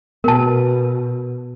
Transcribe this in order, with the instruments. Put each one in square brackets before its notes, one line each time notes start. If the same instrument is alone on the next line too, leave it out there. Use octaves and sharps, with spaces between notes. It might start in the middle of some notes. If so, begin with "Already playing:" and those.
[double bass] B2 [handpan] B3 [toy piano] A#4 A5